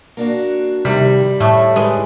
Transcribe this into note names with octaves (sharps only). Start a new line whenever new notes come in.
A#3 D4 F#4
F2 C3 D#3 G3 E4
A2 A3 E4
G#3 G4 B4 C5